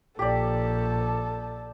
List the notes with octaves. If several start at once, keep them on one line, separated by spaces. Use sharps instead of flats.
A#1 G4 A4 D5